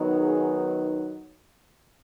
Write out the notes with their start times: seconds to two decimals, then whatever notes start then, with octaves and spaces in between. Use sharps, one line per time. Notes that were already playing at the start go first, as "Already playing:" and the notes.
Already playing: D#3 F#3 B3 D#4
0.18 G#4